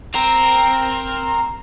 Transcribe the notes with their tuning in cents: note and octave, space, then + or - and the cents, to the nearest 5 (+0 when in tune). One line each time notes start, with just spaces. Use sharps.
C4 +5 A#4 +0